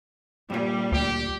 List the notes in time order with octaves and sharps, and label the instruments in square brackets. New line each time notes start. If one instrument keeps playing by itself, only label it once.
[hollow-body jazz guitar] G2 A#2 [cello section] G3
[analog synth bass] D2 [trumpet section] G4